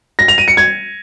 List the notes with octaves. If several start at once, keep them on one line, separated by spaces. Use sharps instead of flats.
A#6
F7
D#7
C#7
G#6